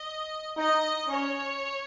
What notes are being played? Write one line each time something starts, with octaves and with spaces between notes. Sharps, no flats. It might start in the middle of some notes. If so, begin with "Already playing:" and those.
Already playing: D#5
D#4 D#5
C#4 C#5